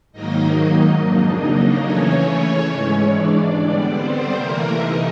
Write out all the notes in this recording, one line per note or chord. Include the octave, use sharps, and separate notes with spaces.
G#2 D#3 F#3 A#3 D#4 D#5
D#4 D#5
F2 C#3 F#3 A#3 D4 D#4 D#5
C#3 E3 A3 C#4 C#5
C#4 C#5
G#2 E3 G#3 C#4 C#5
D4 D5
D3 G3 B3
C4 C5
C3 E3 A3 A#3 A#4
D#4 D#5